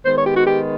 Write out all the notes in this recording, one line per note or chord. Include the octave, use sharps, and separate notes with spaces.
D#3 G#3 B3 C5
C#5
G4
F#4
G4